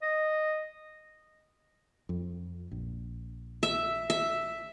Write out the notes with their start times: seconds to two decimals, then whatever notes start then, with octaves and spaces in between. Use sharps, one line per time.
0.02 D#5
2.09 F2
2.71 A#1
3.63 E5
4.10 E5